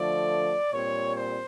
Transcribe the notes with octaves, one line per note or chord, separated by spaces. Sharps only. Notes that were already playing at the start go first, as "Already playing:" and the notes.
Already playing: D3 F3 A3 D5
A#2 G3 C4 C#5
C5